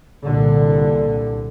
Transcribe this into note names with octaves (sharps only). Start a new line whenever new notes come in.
C2 A#2 D3